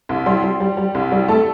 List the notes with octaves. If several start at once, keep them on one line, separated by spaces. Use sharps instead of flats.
C2
G3 C6
G3
G3
G3
C2
G3
A3 A5